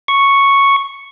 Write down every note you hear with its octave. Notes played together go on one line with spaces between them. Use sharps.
C#6